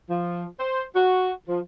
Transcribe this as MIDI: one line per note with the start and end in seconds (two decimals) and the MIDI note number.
0.09 0.44 53
0.60 0.82 72
0.95 1.31 66
1.48 1.60 53